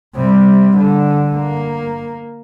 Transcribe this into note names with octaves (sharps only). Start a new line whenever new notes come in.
C3 G3
D3
A#3